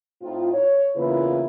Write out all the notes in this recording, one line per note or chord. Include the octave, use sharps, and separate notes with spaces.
A2 C4 D#4 F4
C#5
E2 C#3 A#3 E4 F4 B4